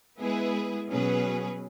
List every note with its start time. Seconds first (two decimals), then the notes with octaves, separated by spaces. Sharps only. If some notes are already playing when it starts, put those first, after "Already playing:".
0.19 G#3 B3 E4 G#4 B4
0.89 B2 F#3 C#4 G#4 B4